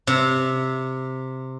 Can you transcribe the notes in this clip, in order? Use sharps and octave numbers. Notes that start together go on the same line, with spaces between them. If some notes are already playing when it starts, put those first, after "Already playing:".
C3